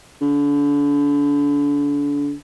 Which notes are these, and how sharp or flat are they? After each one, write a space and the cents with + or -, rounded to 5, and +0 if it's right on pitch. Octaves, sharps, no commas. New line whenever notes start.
D3 -35